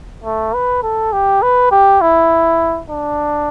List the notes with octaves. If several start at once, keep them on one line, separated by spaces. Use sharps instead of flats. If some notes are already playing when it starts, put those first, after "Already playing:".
A3
B4
A4
G4
B4
G4
E4
D4